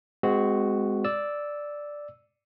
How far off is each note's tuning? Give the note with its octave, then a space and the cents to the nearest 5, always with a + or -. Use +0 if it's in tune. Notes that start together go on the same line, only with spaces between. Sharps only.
G#3 +0 C4 -30 F#4 +0
D5 +0 E6 -5